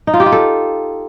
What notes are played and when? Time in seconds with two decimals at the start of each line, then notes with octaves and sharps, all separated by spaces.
0.07 D#4
0.14 F4
0.20 G4
0.26 F4
0.32 A4